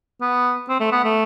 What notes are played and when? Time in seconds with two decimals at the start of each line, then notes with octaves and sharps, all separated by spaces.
0.21 B3
0.69 C4
0.80 A3
0.92 B3
1.04 A3